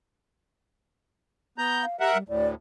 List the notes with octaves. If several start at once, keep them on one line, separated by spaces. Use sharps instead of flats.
B3 A#5 G6
F5
G4 A#4 E5 F#5
G3
D2 A2 D5